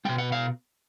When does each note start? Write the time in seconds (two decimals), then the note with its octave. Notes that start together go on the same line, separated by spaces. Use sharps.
0.05 B2 G#3 G5
0.18 F#5
0.32 F5